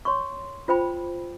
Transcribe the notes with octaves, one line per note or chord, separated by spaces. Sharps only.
C#5 C6 C#6
F4 C5 G5 B5